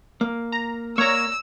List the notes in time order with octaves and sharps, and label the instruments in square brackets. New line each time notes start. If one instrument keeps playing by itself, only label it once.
[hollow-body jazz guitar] A#3
[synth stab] A#5
[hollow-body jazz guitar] A#3 D5 [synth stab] C#5 A#5 [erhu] E6